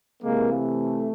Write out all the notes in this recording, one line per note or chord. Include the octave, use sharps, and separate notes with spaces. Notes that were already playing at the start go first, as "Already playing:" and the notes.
C3 E3 G#3 A#3
A3